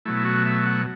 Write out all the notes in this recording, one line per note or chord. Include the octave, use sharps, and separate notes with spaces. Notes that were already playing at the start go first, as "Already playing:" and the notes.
B2 F#3 A3 E4
F#4
E5
F#5